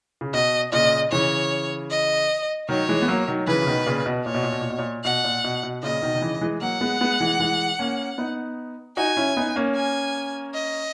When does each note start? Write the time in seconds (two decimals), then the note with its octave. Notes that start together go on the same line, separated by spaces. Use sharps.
0.21 C#3
0.34 B2 D#5
0.72 A#2 C#3 D#5
1.11 C#3 E3 C#5
1.90 D#5
2.69 D#3 F#3 C#5
2.88 E3 G#3
3.02 B3
3.08 F#3 A#3
3.28 D#3 F#3
3.47 C#3 E3 B4
3.62 C#3
3.67 B2 D#3
3.86 A#2 C#3
4.06 B2
4.26 A#2 C#5
4.34 B2
4.43 A#2
4.52 B2
4.61 A#2
4.70 B2
4.79 A#2
5.05 B2 F#5
5.24 A#2
5.44 B2
5.63 B2
5.83 A#2 C#3 D#5
6.02 B2 D#3
6.15 D#3
6.22 C#3 E3
6.41 E3 G#3
6.61 F#3 A#3 F#5
6.81 G#3 B3
7.01 G#3 B3
7.20 E3 G#3
7.40 E3 G#3
7.79 A#3 C#4
8.18 B3 D#4
8.97 D#4 F#4 G#5
9.17 C#4 E4
9.37 B3 D#4
9.56 A#3 C#4
9.76 G#5
10.54 D#5